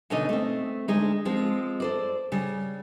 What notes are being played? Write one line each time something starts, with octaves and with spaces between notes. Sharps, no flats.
B2 D3 C#4 D#4 D#5
A3 C4
D2 G#3 D#4
F3 G#3 C4
A4 C5 D5
C#3 G3